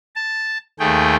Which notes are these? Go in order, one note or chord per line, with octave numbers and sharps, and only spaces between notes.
A5
D#2 A3 G#4 G5